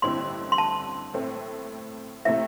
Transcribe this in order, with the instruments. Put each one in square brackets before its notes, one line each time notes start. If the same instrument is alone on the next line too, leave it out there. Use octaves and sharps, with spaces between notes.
[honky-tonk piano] A1 G2 D3 C4 E4 [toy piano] C6
[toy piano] C6
A5
[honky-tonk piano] A2 A3 C4
[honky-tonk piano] C3 A3 C4 E4 [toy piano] E5